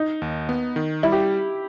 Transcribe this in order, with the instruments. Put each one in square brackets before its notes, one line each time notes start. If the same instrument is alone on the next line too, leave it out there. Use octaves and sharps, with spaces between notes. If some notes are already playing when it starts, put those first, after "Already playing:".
Already playing: [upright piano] D#4
[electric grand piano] D#2
B3
D#3
[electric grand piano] G3 [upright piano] E4
[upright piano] G4